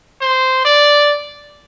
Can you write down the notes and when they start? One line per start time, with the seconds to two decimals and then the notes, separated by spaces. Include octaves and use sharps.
0.21 C5
0.65 D5